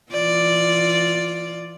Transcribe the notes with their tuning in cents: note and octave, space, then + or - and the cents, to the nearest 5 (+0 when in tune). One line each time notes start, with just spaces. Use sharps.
E3 +30 F4 +5 D5 +0